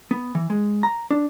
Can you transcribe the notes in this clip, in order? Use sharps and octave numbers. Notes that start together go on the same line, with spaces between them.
B3
E3
G#3
A#5
D4